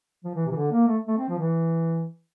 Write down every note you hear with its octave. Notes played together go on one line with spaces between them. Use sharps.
F3
E3
C3
E3
D3
A#3
A3
A3
C4
F3
E3